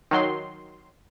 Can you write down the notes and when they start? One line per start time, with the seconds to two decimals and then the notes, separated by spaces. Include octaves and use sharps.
0.11 D#3 F#3 C6